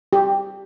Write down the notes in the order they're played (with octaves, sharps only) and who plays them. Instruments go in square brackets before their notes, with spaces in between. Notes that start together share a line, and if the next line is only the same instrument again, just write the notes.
[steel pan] G4